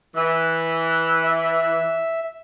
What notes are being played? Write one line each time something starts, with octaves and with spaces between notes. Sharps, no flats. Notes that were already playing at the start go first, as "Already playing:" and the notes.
E3
E5